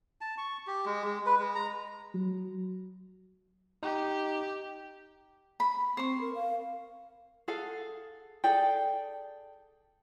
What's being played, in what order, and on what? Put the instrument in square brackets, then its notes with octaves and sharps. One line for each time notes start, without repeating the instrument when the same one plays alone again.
[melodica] A5
C#6
G4
G#3
G#3
B4
G#3
A#5
[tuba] F#3
[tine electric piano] D#4 [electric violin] G4
[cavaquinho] B5
[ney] C4 [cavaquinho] C5 C#6
[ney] A#4
F5
[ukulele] G#4 A4 F5 F#5
G#4 A4 D5 G5